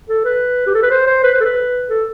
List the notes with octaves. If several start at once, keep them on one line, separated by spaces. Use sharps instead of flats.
A4
B4
G4
A4
B4
C5
C5
B4
C5
A4
B4
A4